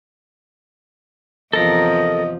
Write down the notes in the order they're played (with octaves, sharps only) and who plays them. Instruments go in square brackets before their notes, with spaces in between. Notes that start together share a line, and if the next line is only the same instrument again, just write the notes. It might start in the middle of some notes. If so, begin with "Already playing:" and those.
[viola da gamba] E2 C3 F3 [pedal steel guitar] A4 A#4 A#5 [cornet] D#5